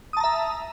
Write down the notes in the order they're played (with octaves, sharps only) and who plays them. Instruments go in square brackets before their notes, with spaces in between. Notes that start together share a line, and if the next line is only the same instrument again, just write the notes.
[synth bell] D#6
A5
A#5
E5